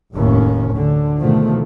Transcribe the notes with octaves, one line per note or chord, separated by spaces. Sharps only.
F1 D#2 A2 C#4
D2 D3
G#2 B2 D3 D#3 F3 A3